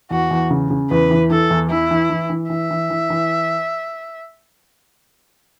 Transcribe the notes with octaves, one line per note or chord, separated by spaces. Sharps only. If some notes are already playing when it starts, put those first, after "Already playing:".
E2 F#4
E2
C#3
C#3
E2 B4
E3
E3 A4
E2
E3 E4
E3
E3
E3
E3 E5
E3
E3
E3